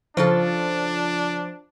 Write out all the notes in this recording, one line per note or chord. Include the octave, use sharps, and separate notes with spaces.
C#3 F3 D4 F4 A4